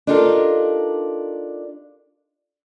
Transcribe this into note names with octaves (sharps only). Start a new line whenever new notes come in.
D4 D#4 F4 G4 A4 A#4